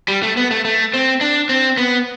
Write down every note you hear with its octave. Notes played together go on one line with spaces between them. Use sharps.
G3
A3
B3
A3
A3
C4
D4
C4
B3